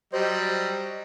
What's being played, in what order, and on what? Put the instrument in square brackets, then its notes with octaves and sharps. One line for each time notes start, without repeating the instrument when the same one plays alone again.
[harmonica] F#3 G3 D#5 [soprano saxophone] C5